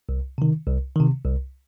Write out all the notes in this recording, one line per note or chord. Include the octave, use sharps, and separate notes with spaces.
C2
C3 D#3
C2
C3 D#3
C2